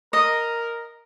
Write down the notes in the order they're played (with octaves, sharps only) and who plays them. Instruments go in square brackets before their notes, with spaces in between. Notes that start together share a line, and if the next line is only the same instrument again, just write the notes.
[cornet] A#4 [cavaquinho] D#5